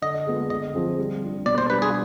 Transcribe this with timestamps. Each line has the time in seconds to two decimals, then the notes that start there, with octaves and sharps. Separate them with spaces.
0.02 D3 D#5
0.27 G#3 B3 F4 G#4
0.50 D3 D#5
0.74 F3 C4 F4 G#4
0.99 G3
1.22 D4 F4
1.45 B2 D5
1.58 C5
1.70 G3 D4 B4
1.82 G#4